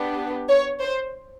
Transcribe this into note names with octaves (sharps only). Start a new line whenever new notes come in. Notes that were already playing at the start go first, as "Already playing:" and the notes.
Already playing: B3 D4 G4
C#5
C5